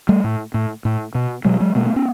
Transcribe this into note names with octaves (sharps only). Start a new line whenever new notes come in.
G3 A3
A2
A2
A2
B2
B2 F#3 G#3
F#3 G#3
B2 G#3 A#3
A3 B3
B3 C#4